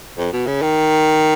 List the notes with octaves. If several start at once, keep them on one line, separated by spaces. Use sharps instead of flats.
F2
B2
C#3
D#3